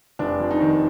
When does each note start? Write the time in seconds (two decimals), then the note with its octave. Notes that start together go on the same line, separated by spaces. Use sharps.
0.19 F1 D4
0.40 F2
0.51 D#4
0.60 D#3